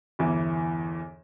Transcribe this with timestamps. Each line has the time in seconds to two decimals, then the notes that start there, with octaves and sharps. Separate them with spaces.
0.19 G1 E2 E3